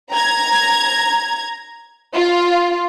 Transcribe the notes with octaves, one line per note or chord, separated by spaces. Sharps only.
A#5 G#6
F4